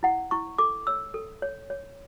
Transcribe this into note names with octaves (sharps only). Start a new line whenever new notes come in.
E4 F#5
E4 C#6
A4 D6
C#5 E6
A4
C#5
C#5